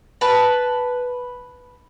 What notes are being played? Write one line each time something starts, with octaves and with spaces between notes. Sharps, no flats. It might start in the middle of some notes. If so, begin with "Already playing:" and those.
B4 A5